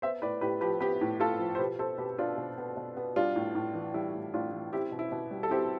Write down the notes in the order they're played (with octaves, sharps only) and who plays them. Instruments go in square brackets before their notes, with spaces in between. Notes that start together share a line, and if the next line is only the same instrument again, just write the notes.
[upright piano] B3 C5 E5
A2 B4 D5
A2 G4 B4
F3 G4 B4
B3 G4 B4
A2
A2 F4 A4
F3
C5
B2 G4 B4
B3 A4 C5
B2 G4 B4
B3 D4 F4
B2
B3
B2
B3
G3 D4 F4
A2
A2
E3
G3 E4
A2
A2 D4 F4
E3
C4 E4 G4
B2
E4
B2
G3
A4
C4 E4 G4